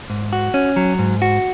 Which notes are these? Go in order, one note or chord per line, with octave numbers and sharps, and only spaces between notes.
G#2
F#4
C#4
F#3
G#2
F#4